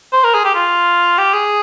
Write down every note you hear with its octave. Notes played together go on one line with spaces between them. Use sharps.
C5
A#4
G#4
G4
F4
G4
G#4